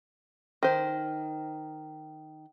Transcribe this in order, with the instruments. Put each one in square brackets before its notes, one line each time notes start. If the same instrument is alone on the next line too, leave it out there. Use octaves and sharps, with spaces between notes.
[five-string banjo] D#3 C5